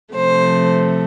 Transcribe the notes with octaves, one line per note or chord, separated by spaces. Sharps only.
C3 F3 A3 C5